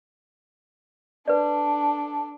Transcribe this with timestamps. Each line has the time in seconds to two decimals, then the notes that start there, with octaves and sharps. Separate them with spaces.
1.28 D4 A4 B4 D5